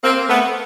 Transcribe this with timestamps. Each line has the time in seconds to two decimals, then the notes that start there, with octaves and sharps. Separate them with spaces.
0.04 A#3 C4
0.29 A3 B3